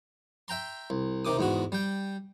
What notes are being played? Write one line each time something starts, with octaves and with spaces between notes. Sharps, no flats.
E5 G5 A#5 C6
C2
C3 D#3 D6 D#6
E2 G#2 B3 F#4
G3 G5